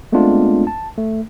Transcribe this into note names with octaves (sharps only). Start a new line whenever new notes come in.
G#3 A3 B3 C4 D4 F4
A5
A3